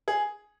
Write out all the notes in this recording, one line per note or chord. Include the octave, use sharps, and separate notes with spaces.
G#4